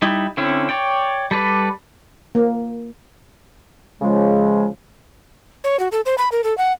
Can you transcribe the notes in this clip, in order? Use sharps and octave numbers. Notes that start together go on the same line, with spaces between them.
G3 D#4 E4
D3 C4 C#4 E4
C#5 D5 G5
G3 A4 B4 D5
A#3
C#3 F3 G#3
C#5
F#4
A4
C5
B5
A#4
A4
F#5